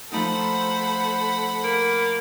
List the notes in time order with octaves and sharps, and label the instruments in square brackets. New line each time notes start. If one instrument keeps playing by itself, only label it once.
[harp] F3 A3 D#4 [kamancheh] A4 C5 [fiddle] F#5 B5
[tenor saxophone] A#3